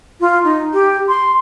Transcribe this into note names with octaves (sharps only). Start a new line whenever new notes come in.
F4
D#4
G4
C6